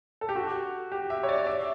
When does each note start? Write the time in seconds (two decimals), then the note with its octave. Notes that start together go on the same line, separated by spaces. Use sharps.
0.21 A4
0.29 G4
0.36 F#4
0.92 G4
1.10 E5
1.23 C#5
1.29 D5
1.47 E5